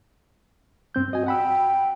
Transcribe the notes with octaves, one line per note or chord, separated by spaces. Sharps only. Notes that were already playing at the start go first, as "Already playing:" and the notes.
G2 C4 G6
F#4 D#5 G#5
F#5 G5 B5 E6